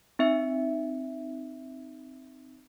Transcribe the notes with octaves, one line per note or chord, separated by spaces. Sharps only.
C4 D#4 E5 C#7